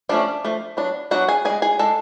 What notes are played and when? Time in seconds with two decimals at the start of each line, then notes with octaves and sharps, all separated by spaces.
0.09 F3 A3 C#4 D4 D5
0.45 F3 A3
0.77 F#3 B3 D4
1.11 F#3 B3 D4 F#4 F#5
1.28 G#4 G#5
1.45 D4 G#4 G#5
1.50 G#3
1.62 G#4 G#5
1.79 G#3 D4 A4 A5